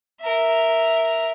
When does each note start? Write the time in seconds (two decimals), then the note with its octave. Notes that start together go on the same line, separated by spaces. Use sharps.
0.22 A#4 E5